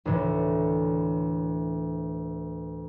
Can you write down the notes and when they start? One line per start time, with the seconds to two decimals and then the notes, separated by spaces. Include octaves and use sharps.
0.06 D2 A2 E3